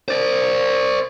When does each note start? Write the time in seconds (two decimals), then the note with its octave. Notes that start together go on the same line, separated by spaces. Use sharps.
0.08 C5 D5